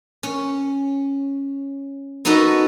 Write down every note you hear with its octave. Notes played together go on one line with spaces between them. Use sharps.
C#4
B3 D#4 F#4 A4 D#5